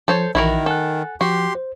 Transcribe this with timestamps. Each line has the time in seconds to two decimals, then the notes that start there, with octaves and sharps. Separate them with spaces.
0.08 F3 A4 C5 C#5
0.35 A#1 D#3 E3 E4 F#4 A#4
0.66 A4 F#5 G#5 F#6
1.21 F3 F#4 G4 C6
1.55 C5